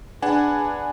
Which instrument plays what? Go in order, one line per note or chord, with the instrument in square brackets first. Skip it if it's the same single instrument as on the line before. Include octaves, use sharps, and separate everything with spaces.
[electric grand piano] D4 F#5 G#5 [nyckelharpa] G#4 [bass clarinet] B4